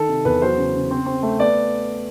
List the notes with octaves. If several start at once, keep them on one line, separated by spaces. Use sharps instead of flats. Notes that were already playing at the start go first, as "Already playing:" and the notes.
Already playing: D#3 A4
C3
E2 B4
F#3 C5
C#3
C#3
C4
C4
A3
B3 D5